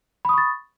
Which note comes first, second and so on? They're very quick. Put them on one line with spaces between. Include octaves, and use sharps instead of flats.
B5 D#6 C#6 A6